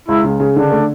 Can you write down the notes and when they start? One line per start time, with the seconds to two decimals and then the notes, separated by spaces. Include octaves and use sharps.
0.08 C#2 E4
0.24 C#3
0.40 C#3
0.55 D3 D4
0.71 A3